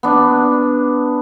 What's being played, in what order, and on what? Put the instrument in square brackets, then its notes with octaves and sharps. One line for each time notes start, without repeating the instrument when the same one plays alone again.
[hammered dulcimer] B3 D4